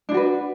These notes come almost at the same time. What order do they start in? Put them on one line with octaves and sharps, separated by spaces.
D4 E4 F#4 B4